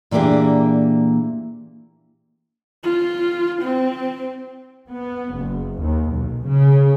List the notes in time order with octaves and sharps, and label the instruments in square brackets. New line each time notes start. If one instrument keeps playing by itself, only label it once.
[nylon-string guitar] A#2 E3 A#3 D4 G4 G#4
[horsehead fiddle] F4
C4
[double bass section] B3
F#1
D#2
B1
C#3